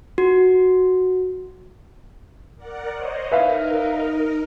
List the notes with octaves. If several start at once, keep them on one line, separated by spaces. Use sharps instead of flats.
F#4
A#4 D5 F#5
C5 C#5 D#5
D#4 A#4 B4 E5 F5